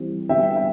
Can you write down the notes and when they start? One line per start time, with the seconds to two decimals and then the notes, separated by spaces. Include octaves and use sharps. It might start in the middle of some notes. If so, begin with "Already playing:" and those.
Already playing: E3 G3 C4
0.29 D3 G3 B3 E5 G5
0.56 E5 G5